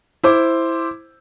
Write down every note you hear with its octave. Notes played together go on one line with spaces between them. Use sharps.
E4 C5 D6